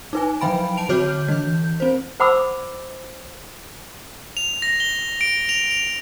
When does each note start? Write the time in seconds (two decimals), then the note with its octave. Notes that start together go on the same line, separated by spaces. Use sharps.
0.13 D#4 B4 G#5
0.41 F3 F#3 G5 B5 D7
0.77 A5 D7 F7
0.89 D3 F#4 C#5 D6 F6 G6
1.28 E3 G6
1.80 C4 C5
2.20 C5 F#5 B5 D6 E6
4.37 F7
4.62 A#6
4.80 G7
5.21 D7
5.49 F7
5.71 F7